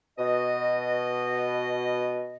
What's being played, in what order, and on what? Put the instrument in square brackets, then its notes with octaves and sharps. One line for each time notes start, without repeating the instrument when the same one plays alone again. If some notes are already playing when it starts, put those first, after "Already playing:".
[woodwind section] B2 D#5